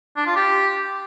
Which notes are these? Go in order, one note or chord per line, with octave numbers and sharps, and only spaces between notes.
D4
F4
G4